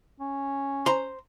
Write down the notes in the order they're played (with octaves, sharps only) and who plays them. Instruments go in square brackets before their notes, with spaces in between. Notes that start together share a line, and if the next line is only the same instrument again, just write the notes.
[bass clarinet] C#4
[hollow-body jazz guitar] C5 A#5 C6